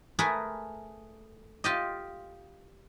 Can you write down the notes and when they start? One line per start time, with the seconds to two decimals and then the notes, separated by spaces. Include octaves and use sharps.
0.19 A3 G#4 A#4 B4
1.64 F4 G4 D#5